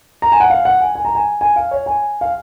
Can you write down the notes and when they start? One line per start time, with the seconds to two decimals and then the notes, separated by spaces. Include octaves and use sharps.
0.22 A#5
0.32 G#5
0.40 F#5
0.50 F5
0.65 F#5
0.81 G#5
0.95 G#5
1.05 A#5
1.15 G#5
1.41 G#5
1.56 F5
1.71 C#5
1.86 G#5
2.21 F5